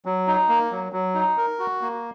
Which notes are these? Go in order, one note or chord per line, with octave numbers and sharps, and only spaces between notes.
F#3
D#4
A#3
F#3
F#3
D#4
A#4
F#4
A#3